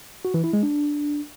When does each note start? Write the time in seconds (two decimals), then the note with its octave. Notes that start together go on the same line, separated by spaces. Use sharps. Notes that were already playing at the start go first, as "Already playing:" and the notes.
0.25 F#4
0.34 E3
0.44 E4
0.53 G#3
0.63 D4